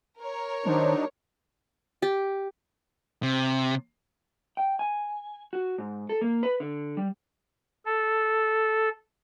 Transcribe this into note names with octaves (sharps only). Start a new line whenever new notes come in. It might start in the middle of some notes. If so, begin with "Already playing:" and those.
A#4 C#5
D#3 F#3 D4 D#4 C5
G4
C3
G5
G#5
F#4
G#2
A4
A#3
B4
D3
G3
A4